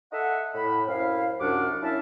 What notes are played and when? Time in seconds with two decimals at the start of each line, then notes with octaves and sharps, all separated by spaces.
0.13 A4 D#5 E5 F#5
0.54 A2 B5
0.87 F#2 C4 E4 F5
1.41 C2 F#2 D4 F#5 D6 F6
1.82 C#4 E4 E5 F5 A5